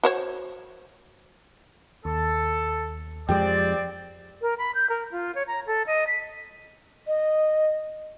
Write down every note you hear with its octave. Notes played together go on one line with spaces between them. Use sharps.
F#4 C5 C#5
D#2 A4
F2 F3 G#3 C4 G4 D5 G5
A#4
B5
G6
A#4
F4
C#5
A#5
A4
D#5
B6
D#5